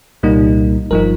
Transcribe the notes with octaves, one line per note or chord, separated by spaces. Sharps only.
C2 A#2 G3 A#3 D#4
G1 G2 F3 D#4 A#4